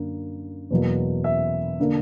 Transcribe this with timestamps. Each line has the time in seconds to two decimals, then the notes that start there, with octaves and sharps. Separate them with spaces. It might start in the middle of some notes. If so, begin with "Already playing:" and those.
Already playing: F#2 D3 A#3
0.71 E2 B2 F#3 A#3
1.24 E5
1.80 D3 A#3